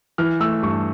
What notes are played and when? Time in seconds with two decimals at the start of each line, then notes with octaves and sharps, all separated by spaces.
0.18 E3 F6
0.40 A3 E6
0.63 G2 C#6